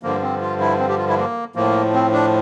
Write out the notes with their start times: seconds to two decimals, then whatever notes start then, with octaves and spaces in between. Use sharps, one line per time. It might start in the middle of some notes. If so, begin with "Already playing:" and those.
0.03 G2 D3 F3 A#3
0.22 C4
0.41 F4
0.60 E4
0.79 C4
0.89 G4
0.98 F4
1.08 E4
1.18 A#3
1.55 A2 F3 A#3
1.93 C4
2.13 D4